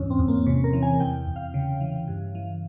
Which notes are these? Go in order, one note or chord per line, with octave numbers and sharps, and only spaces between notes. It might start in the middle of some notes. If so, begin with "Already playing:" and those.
Already playing: E2 G#2 C#4
C4
E2
A#3
C3 C#4
A#4
E3
G#5
E2 G5
E2
F5
C#3
E3
G2
E3